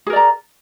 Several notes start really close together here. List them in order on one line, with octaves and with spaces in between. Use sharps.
G#4 A#4 D5 A#5